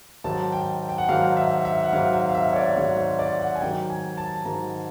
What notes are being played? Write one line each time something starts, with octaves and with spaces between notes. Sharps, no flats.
G#2 D#3 F#3 A5
G5
G5
F#5
G#2 D#3 F#3 F5
E5
E5
F#5
G#2 D#3 F#3 F5
E5
F5
E5
C#5
D5
G#2 D#3 F#3 C#5
C5
D5
F#5
G#5
G#2 D#3 F#3 G5
G#5
A5
G#2 D#3 F#3 A#5